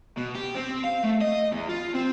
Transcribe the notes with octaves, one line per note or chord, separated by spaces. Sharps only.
B2
G4
C4
F5
A3
D#5
E2
F4
C4